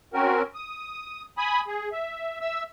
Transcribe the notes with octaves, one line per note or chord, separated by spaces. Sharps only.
C4 C#4 F#4 A#4
D#6
G#5 B5 D#6
G#4
E5
E5 E6